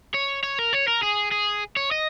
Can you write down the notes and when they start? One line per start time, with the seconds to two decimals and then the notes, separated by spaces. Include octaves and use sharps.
0.14 C#5
0.43 C#5
0.59 A#4
0.73 C#5
0.88 A#4
1.03 G#4
1.32 G#4
1.76 C#5
1.91 D#5